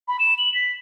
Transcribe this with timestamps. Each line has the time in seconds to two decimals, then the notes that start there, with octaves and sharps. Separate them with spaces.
0.08 B5
0.19 E7
0.38 F#7
0.54 B6